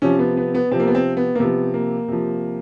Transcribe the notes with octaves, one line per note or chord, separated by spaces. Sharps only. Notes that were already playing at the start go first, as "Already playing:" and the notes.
C3 F3 C#4
B3
B3
B3
C3 F3 C4
A#3
B3
C4
B3
A#3
C3 F3 B3
A#3
C3 F3